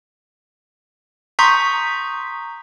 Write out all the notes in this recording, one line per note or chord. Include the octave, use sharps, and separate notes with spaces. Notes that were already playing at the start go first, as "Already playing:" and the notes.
A#5 C6 C#6 D#6 G6 B6